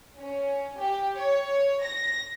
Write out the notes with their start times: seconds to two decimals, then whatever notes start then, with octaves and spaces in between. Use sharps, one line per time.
0.18 C#4
0.79 G4
1.16 C#5
1.83 A#6